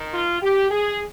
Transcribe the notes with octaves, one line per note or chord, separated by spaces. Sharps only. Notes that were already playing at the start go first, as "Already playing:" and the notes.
Already playing: D#3
F4
G4
G#4